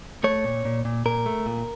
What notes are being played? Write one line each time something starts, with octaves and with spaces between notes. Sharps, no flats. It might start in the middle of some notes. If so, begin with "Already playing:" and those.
A3 C#5
A#2
A#2
A#2
A#2 A#4
A3
A#2